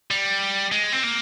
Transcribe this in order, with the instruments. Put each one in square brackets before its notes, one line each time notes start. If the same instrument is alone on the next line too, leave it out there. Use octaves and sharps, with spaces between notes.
[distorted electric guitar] G3
G#3
C4
A#3